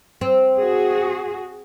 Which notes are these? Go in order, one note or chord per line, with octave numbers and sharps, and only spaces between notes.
C4
F#4 G#4